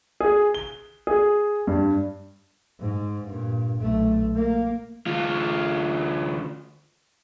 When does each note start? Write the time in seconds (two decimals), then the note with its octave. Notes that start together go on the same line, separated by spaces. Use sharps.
0.21 G#4
0.54 G7
1.07 G#4
1.67 G2
2.80 G#2
3.26 G2 A#2
3.79 B1 A3
4.36 A#3
5.06 D2 F4